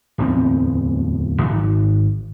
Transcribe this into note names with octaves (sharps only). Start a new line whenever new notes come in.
D1 E2 C4
G#1